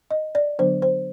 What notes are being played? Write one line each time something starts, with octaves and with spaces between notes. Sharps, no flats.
D#5
D5
D3 F#3 B3 D4 C5
C5